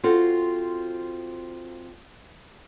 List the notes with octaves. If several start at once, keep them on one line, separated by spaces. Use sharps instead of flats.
C4 F4 F#4 A4